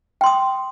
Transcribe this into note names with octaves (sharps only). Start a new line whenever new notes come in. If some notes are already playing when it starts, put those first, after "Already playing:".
G5 C6 D#6